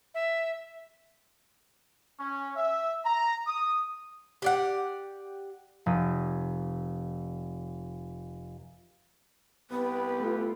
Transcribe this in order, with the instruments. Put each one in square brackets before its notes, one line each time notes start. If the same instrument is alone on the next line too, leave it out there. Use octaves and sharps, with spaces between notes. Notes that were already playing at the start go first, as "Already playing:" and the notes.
[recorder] E5
[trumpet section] C#4
E5
A#5
D#6
[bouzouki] G4 D5 F#5
[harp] F1 D#7
[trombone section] C2 G4 B4 [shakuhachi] B3
[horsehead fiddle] A3 F4